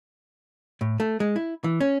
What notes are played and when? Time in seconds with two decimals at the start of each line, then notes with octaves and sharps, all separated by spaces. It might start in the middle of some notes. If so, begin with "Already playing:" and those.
0.81 A2
1.00 A3
1.20 G#3
1.36 E4
1.64 E3
1.81 C#4